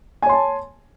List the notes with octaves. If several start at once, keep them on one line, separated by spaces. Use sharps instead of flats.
C#5 G#5 A5 C6